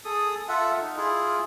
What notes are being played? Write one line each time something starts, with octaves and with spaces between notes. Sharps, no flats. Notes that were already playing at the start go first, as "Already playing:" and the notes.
G#4 A4 D#6
F4 A4 E5 F#5
D#4
E4 F4 G#4